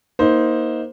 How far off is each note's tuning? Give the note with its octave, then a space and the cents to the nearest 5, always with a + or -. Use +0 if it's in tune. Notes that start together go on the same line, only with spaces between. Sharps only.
A#3 +20 D#4 +25 C5 +0